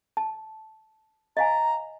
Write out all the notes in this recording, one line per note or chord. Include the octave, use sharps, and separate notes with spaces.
A5
D#5 F5 G#5 A#5